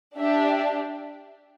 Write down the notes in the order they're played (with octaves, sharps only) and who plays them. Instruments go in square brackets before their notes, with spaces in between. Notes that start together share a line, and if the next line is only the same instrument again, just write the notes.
[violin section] D4 G4 E5